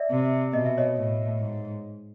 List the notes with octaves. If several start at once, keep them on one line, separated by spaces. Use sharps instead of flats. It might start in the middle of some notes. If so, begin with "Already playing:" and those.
Already playing: D5 E5
C3
B2 D#5
E5
C#5 D#5
A2
G#2